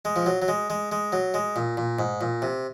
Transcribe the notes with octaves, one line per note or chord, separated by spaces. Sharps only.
G#3
F3
F#3
F#3
G#3
G#3
G#3
F#3
G#3
A#2
A#2
G#2
A#2
C3